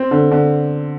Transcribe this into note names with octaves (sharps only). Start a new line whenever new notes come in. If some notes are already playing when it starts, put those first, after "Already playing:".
Already playing: C4
D3
D3